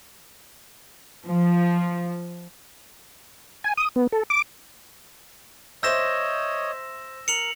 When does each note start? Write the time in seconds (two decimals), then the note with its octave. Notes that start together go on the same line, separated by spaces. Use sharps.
1.24 F3
3.64 G#5
3.77 D#6
3.96 B3
4.12 A4
4.30 D6
5.83 C5 C#5 D#5 E5 E6 G6 A#6 E7
7.28 A#4 C#7 F7 F#7